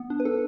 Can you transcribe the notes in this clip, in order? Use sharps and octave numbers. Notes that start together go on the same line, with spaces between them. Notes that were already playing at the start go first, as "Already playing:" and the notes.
Already playing: B3
D4
B4
D4 A4